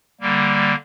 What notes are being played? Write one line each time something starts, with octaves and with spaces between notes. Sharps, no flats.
D3 G3 A#3